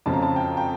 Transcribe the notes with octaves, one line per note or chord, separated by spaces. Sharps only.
F2 C#3 F3 A5
A#5
A5
G5
G5